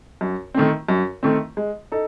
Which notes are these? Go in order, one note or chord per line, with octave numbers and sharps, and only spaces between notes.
F#2
D#3 A3 C4
F#2
D#3 A3 C4
G#3
D#4 A4